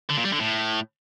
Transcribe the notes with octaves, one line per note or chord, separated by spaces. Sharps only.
D3
A#2
G3
D3
A2